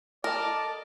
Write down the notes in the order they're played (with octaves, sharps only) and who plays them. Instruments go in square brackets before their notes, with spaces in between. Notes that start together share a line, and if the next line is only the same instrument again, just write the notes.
[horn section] A4 D#5 A5 [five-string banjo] A#4 [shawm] D5